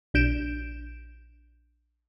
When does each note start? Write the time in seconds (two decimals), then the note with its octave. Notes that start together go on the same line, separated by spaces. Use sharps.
0.14 A#1 D4 G6 D7 E7